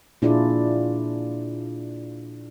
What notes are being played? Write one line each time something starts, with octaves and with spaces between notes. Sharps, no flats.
A#2 D4 E4 F4 G#4 D5